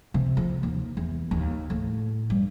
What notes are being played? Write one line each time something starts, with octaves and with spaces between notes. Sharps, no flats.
C3
F3
D#2
E2
D#2
A2
G2